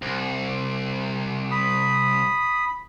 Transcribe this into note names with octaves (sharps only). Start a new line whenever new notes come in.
C2
B5 D#6